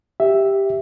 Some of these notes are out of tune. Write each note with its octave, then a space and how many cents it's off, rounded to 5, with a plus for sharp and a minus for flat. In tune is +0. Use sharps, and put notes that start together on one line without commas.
G4 +0 E5 +0